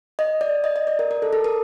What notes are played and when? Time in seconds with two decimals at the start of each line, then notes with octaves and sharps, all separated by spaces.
0.19 D#5
0.41 D5
0.64 D#5
0.76 D#5
0.87 D5
0.99 A#4
1.11 A#4
1.22 A4
1.33 A4
1.44 A#4